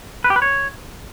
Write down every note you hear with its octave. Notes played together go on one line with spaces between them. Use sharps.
B4
G4
B4
C#5